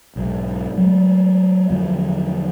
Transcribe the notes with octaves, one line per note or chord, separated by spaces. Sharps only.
B1 G#2
F#3 G#3 A3
E2 D3 F3 F#3